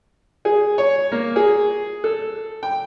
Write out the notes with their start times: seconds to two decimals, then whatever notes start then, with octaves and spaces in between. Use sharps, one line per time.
0.45 G#4
0.78 C#5
1.12 A#3
1.36 G#4
2.04 A4
2.63 G5